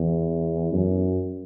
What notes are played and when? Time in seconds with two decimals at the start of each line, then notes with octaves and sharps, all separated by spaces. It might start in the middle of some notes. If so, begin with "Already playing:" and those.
Already playing: E2
0.73 F#2